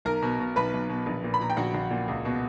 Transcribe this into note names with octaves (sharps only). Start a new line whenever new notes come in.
B1 A#4 A#5
B2
B2
B1 B4 B5
B1
B2
A#1
A#2
B5
A#2 A#5
G5
A#1 F#4 F#5
A#1
A#2
C#2
B2